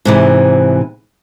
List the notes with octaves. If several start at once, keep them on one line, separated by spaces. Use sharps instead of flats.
G#2 C3 E3